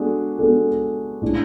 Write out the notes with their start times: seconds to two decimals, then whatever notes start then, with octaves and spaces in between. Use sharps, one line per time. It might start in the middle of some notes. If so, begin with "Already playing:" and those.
Already playing: G#3 B3 D4 F#4 A4
0.39 G#3 B3 D4 F#4 A4
1.22 A2 G#3 D4